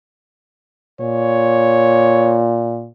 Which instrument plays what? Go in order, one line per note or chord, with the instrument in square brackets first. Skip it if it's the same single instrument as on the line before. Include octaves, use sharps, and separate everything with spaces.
[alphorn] A#2 [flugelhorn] C#5